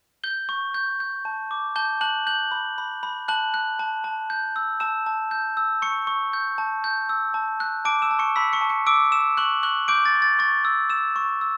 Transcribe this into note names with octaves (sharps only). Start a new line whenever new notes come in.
G6 G7
C#6
G6
G6
A5
D6
A5 G6 G7
A5 F#6 F#7
F#6 G6 F#7
B5
B5
B5
A5 F#6 F#7
F#6
A5
A5
G6
E6
A5 E6 E7
A5
G6
E6
C#6 C#7
C#6
G6
A5
G6
E6
A5
F#6
A5 D6 D7
E6 E7
A5
C#6 C#7
B5 E6 B6
C#6 C#7
A5
C#6 C#7
D6 E6 D7
E6 E7
C#6 F#6 F#7
C#6 F#6 F#7
D6 G6 D7
A6
C#6
A6
C#6 A6
E6
E6 E7
C#6
E6